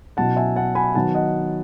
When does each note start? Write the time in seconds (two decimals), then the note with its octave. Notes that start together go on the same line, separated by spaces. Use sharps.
0.17 B2 F#3 C#4 E4 F#5 A5
0.36 E5 G#5
0.56 F#5 A5
0.75 G#5 B5
0.95 D#3 F#3 B3 F#5 A5
1.14 D#5 F#5